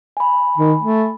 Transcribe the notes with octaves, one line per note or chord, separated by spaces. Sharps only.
G#5 B5
D#3
A3